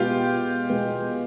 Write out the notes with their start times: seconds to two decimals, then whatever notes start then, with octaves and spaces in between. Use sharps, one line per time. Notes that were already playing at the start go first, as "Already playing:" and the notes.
Already playing: B2 G#3 B3 F4 G4
0.69 B2 G#3 B3